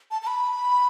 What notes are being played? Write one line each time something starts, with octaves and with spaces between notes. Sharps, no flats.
A5
A5
B5